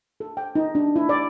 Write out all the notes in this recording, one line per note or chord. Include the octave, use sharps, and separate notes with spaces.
A4
G5
D#4
D4
E4
D5